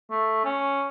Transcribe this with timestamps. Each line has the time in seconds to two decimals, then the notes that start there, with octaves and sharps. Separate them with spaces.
0.11 A3
0.45 C#4